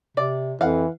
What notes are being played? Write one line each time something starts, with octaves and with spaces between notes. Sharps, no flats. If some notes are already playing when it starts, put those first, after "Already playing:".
C3 D5
F2 E3 F5 F#5